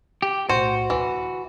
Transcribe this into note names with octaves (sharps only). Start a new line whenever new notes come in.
G4
B1 A2 F#4 C5
D2 E3